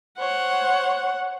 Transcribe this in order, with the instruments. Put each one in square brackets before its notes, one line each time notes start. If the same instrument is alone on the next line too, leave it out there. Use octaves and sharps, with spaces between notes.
[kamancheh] C5 C#5 [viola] F#5